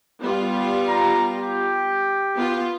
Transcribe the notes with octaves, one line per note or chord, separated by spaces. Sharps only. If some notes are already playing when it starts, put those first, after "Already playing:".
G3 B3 F4
A#5
G4
B3 F4